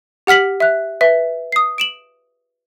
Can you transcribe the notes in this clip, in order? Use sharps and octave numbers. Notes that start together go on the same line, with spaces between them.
G4 F#5 F6 B6 F#7
E5 F#6
B4 E5
D#6 C7
D7 E7 F#7